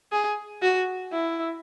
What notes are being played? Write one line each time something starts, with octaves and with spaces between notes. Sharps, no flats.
G#4
F#4
E4